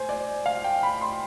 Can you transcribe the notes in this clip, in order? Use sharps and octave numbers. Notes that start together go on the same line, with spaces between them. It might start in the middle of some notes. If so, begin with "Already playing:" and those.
Already playing: C5 G#5
D5
F5
G5
B5
C6